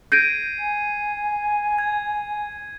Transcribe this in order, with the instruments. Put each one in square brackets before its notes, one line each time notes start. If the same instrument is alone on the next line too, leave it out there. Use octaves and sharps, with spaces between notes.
[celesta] G6 A#6 D7 [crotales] G#6 C7 D#7
[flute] G#5
[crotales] G#6